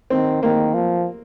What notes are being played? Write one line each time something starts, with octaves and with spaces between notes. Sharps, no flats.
D#3 C4
D#3 A#3
F3